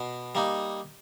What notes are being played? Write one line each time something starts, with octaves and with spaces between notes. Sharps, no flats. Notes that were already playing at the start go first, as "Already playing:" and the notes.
Already playing: B2
G3 A#3 D#4